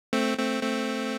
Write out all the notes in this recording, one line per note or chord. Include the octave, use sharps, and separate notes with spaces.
A3 C4
A3 C4
A3 C4